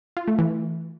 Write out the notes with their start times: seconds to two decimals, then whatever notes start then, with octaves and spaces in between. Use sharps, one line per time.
0.17 F4
0.28 A3
0.39 E3